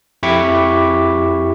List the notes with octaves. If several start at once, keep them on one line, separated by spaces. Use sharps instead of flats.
F2 E4 G4 C#6 D6 B6